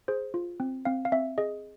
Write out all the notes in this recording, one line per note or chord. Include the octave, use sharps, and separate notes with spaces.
G#4 C5
F4
C4
C4 F5
F5
C4 E5
G#4 D#5